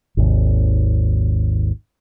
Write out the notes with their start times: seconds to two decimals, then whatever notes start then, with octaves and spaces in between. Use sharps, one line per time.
0.17 G#1 D#2 C3